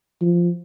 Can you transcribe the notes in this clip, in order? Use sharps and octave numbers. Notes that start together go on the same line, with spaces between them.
F3